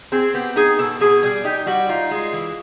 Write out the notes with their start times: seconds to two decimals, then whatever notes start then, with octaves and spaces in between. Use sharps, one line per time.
0.12 C4 G#4
0.34 B3 G4
0.56 D#4 G#4
0.79 B2 A4
1.00 B2 G#4
1.23 G3 G#4
1.44 D#4 G4
1.66 G3 F#4
1.89 D#4 F4
2.11 G#3
2.33 E3